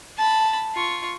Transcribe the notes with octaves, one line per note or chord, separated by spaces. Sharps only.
A5 B5
F4 C#6